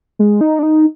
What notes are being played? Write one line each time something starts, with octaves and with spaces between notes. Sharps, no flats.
G#3
D#4
D4
D#4